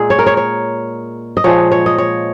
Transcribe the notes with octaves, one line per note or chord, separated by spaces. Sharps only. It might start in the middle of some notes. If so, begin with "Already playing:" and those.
Already playing: A#2 G#3 G#4
C#5
A#4
C#5
C#5
D#5
A#2 F3 G#3 C#5
C#5
D#5
C#5